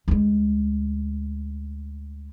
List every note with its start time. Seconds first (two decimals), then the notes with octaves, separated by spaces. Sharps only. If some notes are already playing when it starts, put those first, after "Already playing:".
0.08 D2 G#3